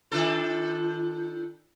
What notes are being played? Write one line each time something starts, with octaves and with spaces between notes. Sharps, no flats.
D#3 D4 F4 A4